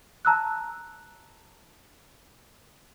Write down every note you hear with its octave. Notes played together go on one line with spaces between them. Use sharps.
A5 A#5 E6 F#6